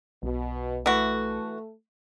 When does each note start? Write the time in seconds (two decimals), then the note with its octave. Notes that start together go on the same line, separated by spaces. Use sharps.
0.23 B1 B2
0.86 E3 A3 F#4